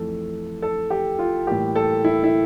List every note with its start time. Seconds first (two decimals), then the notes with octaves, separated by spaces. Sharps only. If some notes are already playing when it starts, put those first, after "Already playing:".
Already playing: F2 E3 A3 A4
0.62 A4
0.90 G4
1.19 F4
1.47 A2 E3 G3 A#3 G4
1.75 A4
2.04 E4
2.23 E4